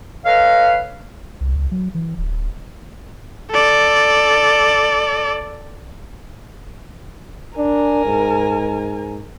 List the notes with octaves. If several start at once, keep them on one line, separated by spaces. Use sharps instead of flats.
A4 B4 C#5 D#5 F5
C2
C#2
F#3
E3
D1
A4 D5
D4 A#4 G#5
G#2